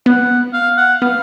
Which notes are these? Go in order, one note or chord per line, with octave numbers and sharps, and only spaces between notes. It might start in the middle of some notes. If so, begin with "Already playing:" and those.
B3 F#5
F5
F#5
B3 F5